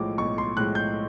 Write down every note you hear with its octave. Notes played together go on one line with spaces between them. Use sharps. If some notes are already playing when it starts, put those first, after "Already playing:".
Already playing: B1 A2 F3 G#3 D6
B1 C#6
C6
A2 F3 G#3 F#6
G6